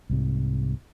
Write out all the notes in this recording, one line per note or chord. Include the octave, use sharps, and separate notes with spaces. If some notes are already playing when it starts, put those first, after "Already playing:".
C2 G#2 C3